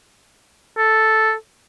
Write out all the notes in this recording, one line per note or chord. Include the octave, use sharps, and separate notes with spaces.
A4